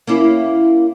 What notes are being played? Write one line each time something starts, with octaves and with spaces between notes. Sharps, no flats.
A#3 C#4 E4